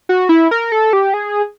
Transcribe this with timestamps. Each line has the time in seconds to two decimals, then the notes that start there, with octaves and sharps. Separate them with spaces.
0.09 F#4
0.29 E4
0.51 A#4
0.72 A4
0.93 G4
1.14 G#4